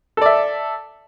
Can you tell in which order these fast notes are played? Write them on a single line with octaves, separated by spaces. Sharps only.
A4 D5 E5